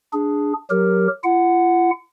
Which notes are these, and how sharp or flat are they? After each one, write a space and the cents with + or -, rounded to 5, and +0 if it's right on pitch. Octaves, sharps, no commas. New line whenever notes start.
D4 +0 G#4 +0
F#3 +0 G4 +0 A#4 +0
F4 -45 F#5 +0